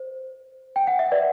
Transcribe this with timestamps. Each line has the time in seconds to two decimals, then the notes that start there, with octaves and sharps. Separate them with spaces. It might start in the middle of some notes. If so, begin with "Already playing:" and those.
Already playing: C5
0.76 G5
0.87 F#5
0.99 E5
1.12 B4 D5